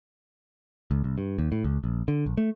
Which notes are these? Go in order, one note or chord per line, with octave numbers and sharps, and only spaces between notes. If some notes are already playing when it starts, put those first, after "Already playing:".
C#2
C2
G2
D#2
A2
C#2
A#1
D3
A#1
A3